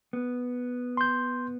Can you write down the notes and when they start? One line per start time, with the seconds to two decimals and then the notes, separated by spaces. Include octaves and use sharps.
0.13 B3
0.97 C6 G6